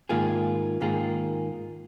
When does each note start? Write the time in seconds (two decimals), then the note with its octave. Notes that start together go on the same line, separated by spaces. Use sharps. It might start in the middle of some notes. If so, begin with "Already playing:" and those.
0.09 G#2 D#3 A#3 F4 G#4
0.81 G#2 D#3 A#3 F4 G#4